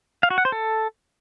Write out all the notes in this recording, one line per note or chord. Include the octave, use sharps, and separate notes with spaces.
F5
F#4
F#5
C5
A4